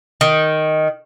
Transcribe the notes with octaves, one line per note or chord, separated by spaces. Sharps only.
D#3